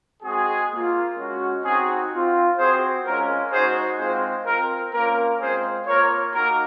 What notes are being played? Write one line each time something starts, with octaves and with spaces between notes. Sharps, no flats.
G#3 C4 F#4 G#4
A#3 F4
G#3 C#4 F#4
C4 D#4 F#4 G#4
C4 F4
C4 F#4 G#4 C5
G#3 C#4 F4 A#4
G#3 D#4 F#4 G#4 C5
G#3 C4 F4 G#4 C5
C4 F4 A#4
A#3 C#4 F4 A#4
G#3 C4 F4 G#4 C5
A#3 F4 A#4 C#5
A#3 D#4 F#4 A#4